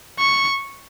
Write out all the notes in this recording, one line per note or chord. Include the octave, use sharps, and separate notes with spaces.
C#6